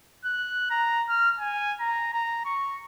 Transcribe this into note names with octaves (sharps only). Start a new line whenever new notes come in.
F#6
A#5
F6
G#5
A#5
A#5
C#6